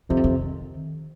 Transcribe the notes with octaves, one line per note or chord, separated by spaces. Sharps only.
F2 C3 D#3 F3
D3
D#3